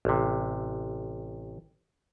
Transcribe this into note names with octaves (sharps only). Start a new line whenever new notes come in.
A1 C3